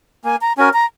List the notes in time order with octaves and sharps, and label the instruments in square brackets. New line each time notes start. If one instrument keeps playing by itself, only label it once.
[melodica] A#3 [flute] G#5
[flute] A#5
[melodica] C#4 F#4 A#4 [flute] G#5
[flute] A#5